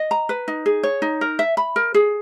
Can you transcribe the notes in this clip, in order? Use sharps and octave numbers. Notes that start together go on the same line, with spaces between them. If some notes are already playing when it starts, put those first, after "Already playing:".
Already playing: D#5
A#5
B4
D#4
G#4
C#5
D#4
A#4
E5
B5
A#4
G#4